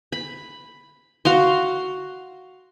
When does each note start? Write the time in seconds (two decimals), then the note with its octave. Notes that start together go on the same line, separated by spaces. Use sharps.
0.12 B5
1.25 F#4 F5 C6